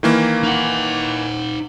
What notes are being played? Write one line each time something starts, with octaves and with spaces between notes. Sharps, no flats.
D#3 E3 A#3
D#4 F#5